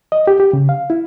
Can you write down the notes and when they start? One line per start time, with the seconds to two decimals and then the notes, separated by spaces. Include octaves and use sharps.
0.12 D#5
0.27 G4
0.40 G4
0.53 C#3
0.69 F5
0.90 E4